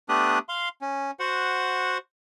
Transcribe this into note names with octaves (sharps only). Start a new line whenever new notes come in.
A3 B3 D4 G4 D#6 F#6
F5 C6
C#4
F#4 C5 F#5